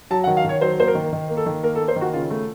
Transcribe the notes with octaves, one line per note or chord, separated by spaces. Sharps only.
F#3 A5
F#5
D#3
F5
D#3 C#5
F#3 C5
A#3 C5
A#4
D#3
D#3
A#3
A4
D#3
A#3 A#4
A4
A#3
C5
D#3
F#4
C#3 F4
A3